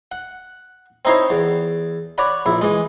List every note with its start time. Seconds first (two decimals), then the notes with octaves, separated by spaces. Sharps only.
0.12 F#5
1.05 C4 D#4 E4 C5 C#5
1.30 E2
2.18 C#5 D5 F#5 B5
2.46 A#1 E4
2.61 E3 G#3